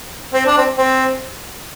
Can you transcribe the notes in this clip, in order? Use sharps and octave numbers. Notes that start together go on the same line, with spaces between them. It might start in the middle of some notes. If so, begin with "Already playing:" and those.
C4
D4
C4
C4